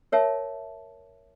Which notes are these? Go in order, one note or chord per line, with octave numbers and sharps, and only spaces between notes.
A#4 C#5 E5 A5